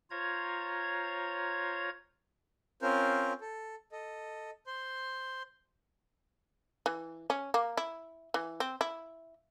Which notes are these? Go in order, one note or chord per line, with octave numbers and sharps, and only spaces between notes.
F4 C5 C#5 A#5 G#6
C4 C#4 F4 A#4 C5
A4
A4 D#5
C5 C6
E3
C#4
A#3
E4
E3
C4
E4